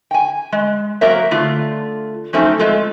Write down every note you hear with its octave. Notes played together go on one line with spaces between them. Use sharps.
G5 G#5
G#3
F#3 A#3 C4 A#4 C#5 E5
D3 A3 F4
F3 F#3 A3 C4 C#4 D#4
G#3 A3 F4 A4